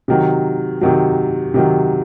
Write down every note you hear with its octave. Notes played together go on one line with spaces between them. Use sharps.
C3 D#3 F#3
C3 D#3 F#3
C3 D#3 F#3